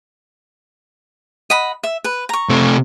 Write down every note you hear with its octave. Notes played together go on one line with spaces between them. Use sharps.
D#5 F#5 B5
E5
B4
A#5 C#6
C3 A3